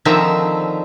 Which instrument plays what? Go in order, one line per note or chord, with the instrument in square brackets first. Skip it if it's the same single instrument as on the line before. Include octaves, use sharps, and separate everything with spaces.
[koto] D3 D#3 F3 C4 E5 A#5